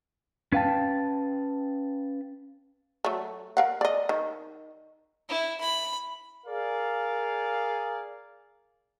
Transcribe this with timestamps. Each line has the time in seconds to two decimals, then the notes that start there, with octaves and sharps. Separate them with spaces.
0.52 C#4 B4 F5 G5 A5
3.05 F#3 A3
3.57 A#4 F5 F#5
3.81 D5 D#5
4.09 D#3
5.29 E4
5.60 B5
6.47 G#4 A#4 D5 F5